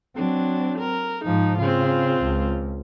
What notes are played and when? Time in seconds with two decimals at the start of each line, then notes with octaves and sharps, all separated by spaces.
0.16 F#3 C4 D4
0.79 A#4
1.25 G#2 F3 D#4
1.59 C#3 C4 F4
2.23 C#2